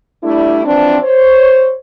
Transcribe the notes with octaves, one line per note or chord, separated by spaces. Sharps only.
G3 A3 D4 E4
E3 F3 C4 D4
C5 C#5